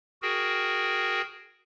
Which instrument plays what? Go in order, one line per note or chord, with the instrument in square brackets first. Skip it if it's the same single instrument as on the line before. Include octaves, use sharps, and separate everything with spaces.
[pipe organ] F#4 G#4 A#4 G5